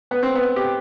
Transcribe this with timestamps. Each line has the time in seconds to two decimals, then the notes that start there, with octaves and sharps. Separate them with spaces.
0.11 B3
0.23 C4
0.35 B3
0.56 G4